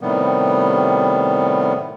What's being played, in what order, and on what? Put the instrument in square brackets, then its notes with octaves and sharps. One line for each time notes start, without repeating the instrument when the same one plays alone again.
[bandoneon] A2 C3 D#3 G3 B3